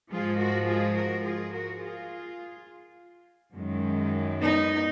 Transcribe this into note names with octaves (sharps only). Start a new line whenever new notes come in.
G#2 F3 G#3 F4 G#4
F#4 A#4
F4 G#4
F#4 A#4
F4 G#4
F#4 A#4
F4 G#4
F#2 D#3 G#3
B3 D#4